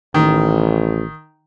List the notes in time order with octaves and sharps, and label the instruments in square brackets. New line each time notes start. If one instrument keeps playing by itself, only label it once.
[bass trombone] A1 [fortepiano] D#3